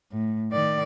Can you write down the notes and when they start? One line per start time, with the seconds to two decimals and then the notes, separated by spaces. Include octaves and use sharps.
0.11 A2
0.52 D#3 D5